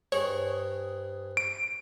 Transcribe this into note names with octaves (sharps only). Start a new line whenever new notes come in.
G2 G#4 C5 C#5 D#5
D7